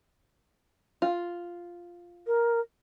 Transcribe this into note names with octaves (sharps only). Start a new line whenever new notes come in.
F4
A#4